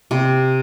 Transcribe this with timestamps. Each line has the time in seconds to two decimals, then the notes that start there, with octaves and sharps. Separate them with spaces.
0.11 C3